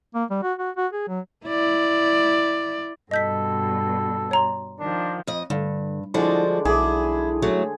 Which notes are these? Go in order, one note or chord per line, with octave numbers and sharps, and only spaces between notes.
A#3
G3
F#4
F#4
F#4
G#4
F#3
E4 D5
G2 B2 A4 D#5 G6 B6
C#5 A#5 C6
D#3 F3 D4
F2 D#5
G2 D3
D3 F3 G#3 D4 E4 F#4
B1 E4 G#4 D6
F#2 F#3 A3